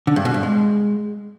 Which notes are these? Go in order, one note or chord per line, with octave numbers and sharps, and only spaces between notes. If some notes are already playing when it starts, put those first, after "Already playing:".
D3
G2
B2
G2
G#3